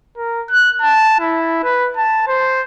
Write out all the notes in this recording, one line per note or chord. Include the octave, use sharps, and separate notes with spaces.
A#4
F#6
A5
E4
B4
A5
C5